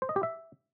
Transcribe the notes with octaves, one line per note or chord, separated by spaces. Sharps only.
C5
D#5
G4
E5